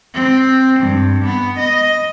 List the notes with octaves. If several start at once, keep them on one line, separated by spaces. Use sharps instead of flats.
C4
G2
B3
D#5